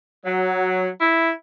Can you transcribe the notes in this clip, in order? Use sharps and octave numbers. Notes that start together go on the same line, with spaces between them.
F#3
E4